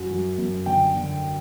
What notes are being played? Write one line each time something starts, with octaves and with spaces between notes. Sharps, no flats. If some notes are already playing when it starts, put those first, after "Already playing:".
Already playing: F#2 F#3
F#3
F#2
D3 G5
D3